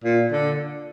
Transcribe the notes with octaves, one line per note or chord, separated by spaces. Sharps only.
A#2
D3